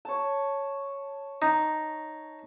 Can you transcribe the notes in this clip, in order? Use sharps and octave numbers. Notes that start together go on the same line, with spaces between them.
C#5 A5
D#4